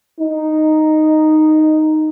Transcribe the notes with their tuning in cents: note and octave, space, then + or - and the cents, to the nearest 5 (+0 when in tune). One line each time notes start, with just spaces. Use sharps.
D#4 -5